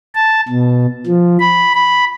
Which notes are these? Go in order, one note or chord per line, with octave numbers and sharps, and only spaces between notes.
A5
B2
F3
B5
B5